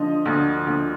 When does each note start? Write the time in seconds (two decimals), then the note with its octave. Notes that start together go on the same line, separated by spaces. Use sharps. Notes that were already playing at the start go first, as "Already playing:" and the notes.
Already playing: D3 F3 D#5
0.25 D2
0.66 D2